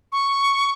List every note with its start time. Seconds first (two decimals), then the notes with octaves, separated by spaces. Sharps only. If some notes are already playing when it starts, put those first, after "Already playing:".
0.12 C#6